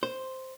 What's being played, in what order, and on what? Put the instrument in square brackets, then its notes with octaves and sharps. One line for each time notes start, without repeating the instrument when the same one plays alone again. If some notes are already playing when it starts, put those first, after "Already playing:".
[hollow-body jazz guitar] C5